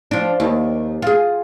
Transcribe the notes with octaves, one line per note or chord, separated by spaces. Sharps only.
F3 D4
D#2
F4 G#4